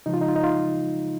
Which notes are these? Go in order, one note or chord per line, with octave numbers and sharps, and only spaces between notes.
C#3 F3 G#3 D#4
F4
D#4
F4
D#4
F4